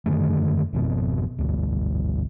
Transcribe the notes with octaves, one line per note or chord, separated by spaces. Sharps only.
F#2 D3 D#3 A3
G#1 F2 B2
G#1 D2